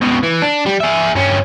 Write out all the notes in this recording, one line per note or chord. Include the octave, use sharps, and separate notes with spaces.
C#2 B2
E3
D4
G3
G#4 E5
G2 C#4